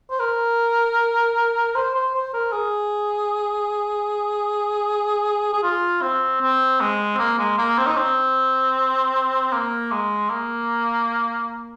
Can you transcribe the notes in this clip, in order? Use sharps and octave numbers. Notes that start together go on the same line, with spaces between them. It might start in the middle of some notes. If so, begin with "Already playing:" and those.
C5
A#4
C5
C5
C5
A#4
G#4
G#4
F4
C4
C4
G#3
C4
A#3
G#3
A#3
C4
D#4
C4
A#3
G#3
A#3